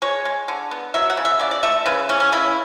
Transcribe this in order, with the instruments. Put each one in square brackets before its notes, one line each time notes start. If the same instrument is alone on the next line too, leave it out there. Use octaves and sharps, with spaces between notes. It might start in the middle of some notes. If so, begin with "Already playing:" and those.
[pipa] G#3 C#5
G#3
D3
B3
F#3 E5
F#5
C#3
E5
C#3 D5
D5
A3 E5
C#3 B4
E3 C#4
C#4
C#3 E4